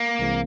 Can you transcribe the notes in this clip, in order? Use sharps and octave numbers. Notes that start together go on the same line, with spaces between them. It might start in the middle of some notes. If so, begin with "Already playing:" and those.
Already playing: A#3
C2 C3 E3 G#3 C4